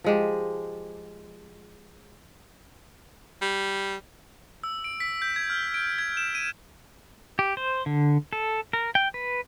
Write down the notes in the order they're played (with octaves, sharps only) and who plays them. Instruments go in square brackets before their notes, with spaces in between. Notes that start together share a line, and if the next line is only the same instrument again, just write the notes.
[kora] F3 G#3 G4
[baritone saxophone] G3
[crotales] E6
D7
B6
G6
G#6
F6
D7
G#6
E7
D#7
[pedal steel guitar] G4
C5
D3
A4
A#4
G5
B4